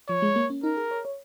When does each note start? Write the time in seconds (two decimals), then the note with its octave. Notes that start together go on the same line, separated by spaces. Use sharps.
0.08 F3 C#5
0.22 G#3
0.36 A#3
0.50 C#4
0.63 D#4 A#4
0.77 G#4
0.91 C#5
1.05 C#5